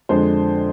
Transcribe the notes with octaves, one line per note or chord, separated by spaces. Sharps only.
F2 D3 G#3 D4 C5